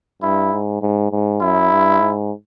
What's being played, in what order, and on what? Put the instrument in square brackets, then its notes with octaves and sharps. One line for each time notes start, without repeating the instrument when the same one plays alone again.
[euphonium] G2 [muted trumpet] E4
[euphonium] G#2
G#2
G#2
[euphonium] F#2 [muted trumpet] E4
[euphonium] G2
G#2